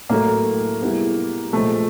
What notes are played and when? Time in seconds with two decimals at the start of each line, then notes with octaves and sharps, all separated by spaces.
0.09 A2 F#3 A3 A#3
0.81 G3 B3 E4 G#4
1.53 A#2 F3 G#3 A3